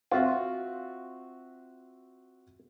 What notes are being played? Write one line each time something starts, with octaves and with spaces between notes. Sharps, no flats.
C4 F4 F#4 E5